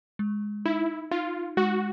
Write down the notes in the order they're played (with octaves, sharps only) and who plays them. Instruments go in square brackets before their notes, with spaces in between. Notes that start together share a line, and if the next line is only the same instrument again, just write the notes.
[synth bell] G#3
[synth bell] D#4 [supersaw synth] E4
[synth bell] D#4 [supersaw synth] F4
[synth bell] G#3 [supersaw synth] F#4